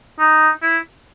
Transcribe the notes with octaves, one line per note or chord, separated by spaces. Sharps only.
D#4
E4